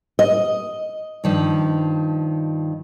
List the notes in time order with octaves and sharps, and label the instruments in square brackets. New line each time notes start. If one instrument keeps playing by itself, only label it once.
[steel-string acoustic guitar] D#5
[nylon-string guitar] G2 D#3 F3